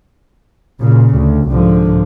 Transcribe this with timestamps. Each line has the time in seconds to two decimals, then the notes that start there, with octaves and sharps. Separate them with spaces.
0.81 A#2 C#3
1.18 D2
1.51 C2 G#2 D3 F3